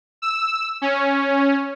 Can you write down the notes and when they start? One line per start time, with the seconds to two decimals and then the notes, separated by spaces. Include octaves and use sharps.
0.22 E6
0.82 C#4